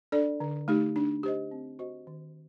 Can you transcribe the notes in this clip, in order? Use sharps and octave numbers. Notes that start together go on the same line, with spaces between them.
D4 A4 D5
D3
A3 D#4 G4
D4
G4 C5 D#5
C4
F#4 C5 D#5
D#3